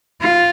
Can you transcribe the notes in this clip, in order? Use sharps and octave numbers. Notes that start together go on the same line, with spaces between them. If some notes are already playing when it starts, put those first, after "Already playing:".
F4